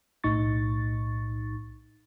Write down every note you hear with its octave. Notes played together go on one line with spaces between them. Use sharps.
B1 A2 D#4 C#6 A6